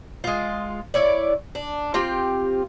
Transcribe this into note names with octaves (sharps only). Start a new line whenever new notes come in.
G#3 F4
E4 C#5 D5
D4
C4 F4 G4